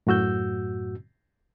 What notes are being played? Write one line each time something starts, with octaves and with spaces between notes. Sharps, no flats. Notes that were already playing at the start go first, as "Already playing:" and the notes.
F#2 A2 F#4 E6 G6